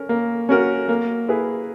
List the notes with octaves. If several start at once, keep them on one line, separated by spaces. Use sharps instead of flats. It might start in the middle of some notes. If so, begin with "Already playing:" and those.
Already playing: C#4 A#4
A#3
C#4 F#4 A#4
A#3
E4 G#4 B4